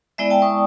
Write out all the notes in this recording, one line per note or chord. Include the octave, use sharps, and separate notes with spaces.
G#3 B3 E4 D5 E5
G5 A5
C#6 D#6